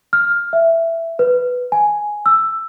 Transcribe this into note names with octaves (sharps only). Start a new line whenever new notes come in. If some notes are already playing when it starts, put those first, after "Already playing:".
F6
E5
B4
G#5
E6